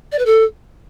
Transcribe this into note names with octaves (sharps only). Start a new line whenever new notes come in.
D5
B4
A4